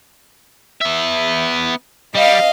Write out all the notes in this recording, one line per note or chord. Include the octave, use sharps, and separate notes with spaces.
B3 E5
G3 D#5 F5